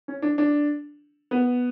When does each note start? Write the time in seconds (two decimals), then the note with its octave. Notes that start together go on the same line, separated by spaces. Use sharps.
0.08 C#4
0.22 D4
0.38 D4
1.31 B3